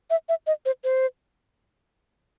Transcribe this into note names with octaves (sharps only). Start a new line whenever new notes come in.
E5
E5
D#5
C5
C5